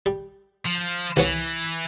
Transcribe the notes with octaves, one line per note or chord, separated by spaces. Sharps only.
G3
F3
C2 E3 B3 C#5